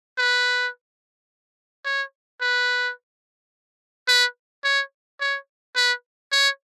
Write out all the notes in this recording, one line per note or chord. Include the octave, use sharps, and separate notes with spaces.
B4
C#5
B4
B4
C#5
C#5
B4
C#5